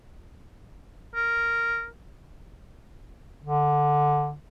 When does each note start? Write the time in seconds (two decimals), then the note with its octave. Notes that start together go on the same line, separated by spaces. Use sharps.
1.15 A#4
3.44 D3